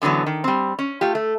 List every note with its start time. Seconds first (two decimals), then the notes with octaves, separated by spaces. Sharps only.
0.02 F#2 D3 E3 F#3 B3
0.26 D#3
0.44 G3 C4
0.79 C#4
1.01 A3 F4 G4
1.15 A3